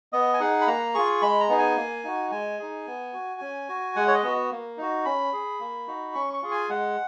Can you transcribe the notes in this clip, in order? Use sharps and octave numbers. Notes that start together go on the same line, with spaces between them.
B3 D#5
G#5
D#4 G#4 F#5
B5
A#3 A#5
F4 G#4 C#6
G#3 B5
A#5
B3 D#4 G#4
G#5
A#3
D#4 F#4
G#3 G#5
D#4 G#4
B3
F#4
C#4
F#4
G#3 F#5
C#5
D#5
B3 F#4
A#3
D#4 F#4
C#4 B5
G#4
A#3
D#4 F#4
C#4 C#6
C#6
F4 G#4
G#5
G#3 F#5